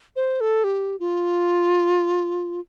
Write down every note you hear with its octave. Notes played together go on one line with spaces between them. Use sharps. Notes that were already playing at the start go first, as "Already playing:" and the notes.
C5
A4
G4
F4